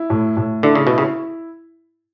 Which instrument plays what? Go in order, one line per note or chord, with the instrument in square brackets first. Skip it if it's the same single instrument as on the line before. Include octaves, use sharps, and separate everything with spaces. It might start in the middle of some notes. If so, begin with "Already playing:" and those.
Already playing: [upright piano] E4
A2
A2
[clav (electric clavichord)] D3 [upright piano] E4
[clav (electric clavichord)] C#3
[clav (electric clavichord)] B2 [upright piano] E4
[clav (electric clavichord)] C#3